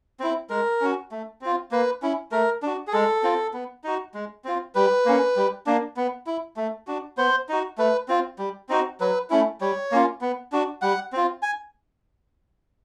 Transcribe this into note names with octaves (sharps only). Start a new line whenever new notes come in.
C4 E4
G#3 A#4
C#4 F#4
A3
C4 F4
A#3 B4
C#4 E4
A3 A#4
D4 F#4
G#4
G#3 A4
C4 F4
B3
D#4 F#4
G#3
C4 F4
G3 B4
A#3 C#4
G3
A#3 D4
B3
E4
A3
D4 F#4
B3 C5
D#4 F#4
A3 B4
C4 F4
G3
C4 D#4 F#4
F#3 B4
A3 C#4 E4
G3 C#5
A#3 C#4 F4
B3
D4 F#4
G3 F#5
C4 F4
G#5